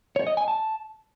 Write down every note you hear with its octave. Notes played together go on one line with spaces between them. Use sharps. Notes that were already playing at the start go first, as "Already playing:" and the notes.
C#5
D#5
G#5
A5